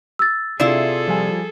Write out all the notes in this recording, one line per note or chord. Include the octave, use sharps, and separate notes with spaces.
E6 A6
C3 E4 F4 G#4 A4 D5
F3 G3 G#5